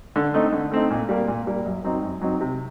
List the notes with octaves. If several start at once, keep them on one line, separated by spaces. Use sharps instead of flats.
D3
A3 C4 D#4
D3
A3 C4 D#4
A#2
G3 A#3
A#2
G3 A#3
F#2
F#3 C4 D#4
F#2
F#3 C4 D#4
C3